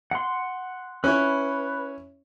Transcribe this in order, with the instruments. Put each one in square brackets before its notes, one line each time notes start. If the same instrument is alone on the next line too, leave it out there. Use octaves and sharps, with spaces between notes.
[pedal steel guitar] F#5 C6
[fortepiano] C#4 E4 C#5 [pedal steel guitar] B4